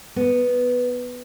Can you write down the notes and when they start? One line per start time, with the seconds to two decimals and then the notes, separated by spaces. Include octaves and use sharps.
0.16 B3